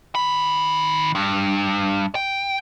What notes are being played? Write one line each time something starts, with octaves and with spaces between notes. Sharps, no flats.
D#3 B5
G2
G5